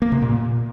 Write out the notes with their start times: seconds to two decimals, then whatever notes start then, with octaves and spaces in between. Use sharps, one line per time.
0.02 A#3
0.12 C3
0.22 A#2